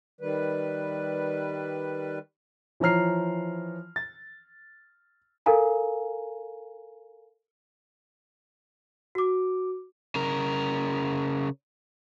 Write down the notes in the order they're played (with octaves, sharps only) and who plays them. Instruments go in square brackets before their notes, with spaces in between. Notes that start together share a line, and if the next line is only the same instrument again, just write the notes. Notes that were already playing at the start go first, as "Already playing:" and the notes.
[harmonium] D#3 G3 B4
[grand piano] E3 F3 C#5 A#5 F6 C7
A6
[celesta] A4 A#4 F5 G#5 A#5
F#4 D6
[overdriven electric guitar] C#3 A#4